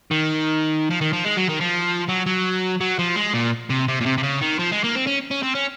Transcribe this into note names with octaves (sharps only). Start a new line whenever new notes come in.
D#3
F3
D#3
F3
G#3
F#3
D#3
F3
F#3
F#3
F#3
F3
G#3
A#2
C3
C3
A#2
C3
C3
C#3
D#3
F3
G#3
A#3
C4
C#4
C#4
C4
C#4